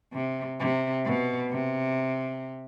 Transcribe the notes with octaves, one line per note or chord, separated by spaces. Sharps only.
C3
C3
B2
C3